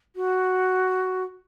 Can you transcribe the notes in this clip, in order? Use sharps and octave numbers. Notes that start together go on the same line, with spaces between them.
F#4